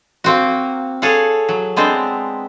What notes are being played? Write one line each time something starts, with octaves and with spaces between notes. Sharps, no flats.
A#3 C4 F#4
G#4 A4 C#5 F5 F#5
F#3
G#3 B3 C4 D4 C5